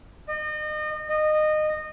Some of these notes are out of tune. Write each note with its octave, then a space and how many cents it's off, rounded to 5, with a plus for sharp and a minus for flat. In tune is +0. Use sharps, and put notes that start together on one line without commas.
D#5 -35
D#5 -20